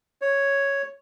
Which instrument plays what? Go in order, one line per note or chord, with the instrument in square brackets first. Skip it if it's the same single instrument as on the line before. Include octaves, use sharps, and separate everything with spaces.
[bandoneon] C#5